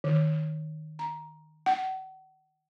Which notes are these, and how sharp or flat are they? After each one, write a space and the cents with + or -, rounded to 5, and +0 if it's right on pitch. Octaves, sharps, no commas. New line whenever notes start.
D#3 -5
A#5 +10
F#5 +40